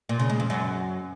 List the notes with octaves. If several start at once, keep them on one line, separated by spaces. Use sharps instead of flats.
A#2
C#3
G#3
F2
F#2